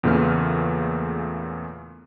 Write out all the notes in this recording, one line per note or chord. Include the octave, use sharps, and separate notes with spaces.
E2 A#2 C#3 A3 B4 F6